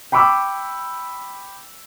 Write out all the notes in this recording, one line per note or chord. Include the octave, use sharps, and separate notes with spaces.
G5 B5 C#6 D6 E6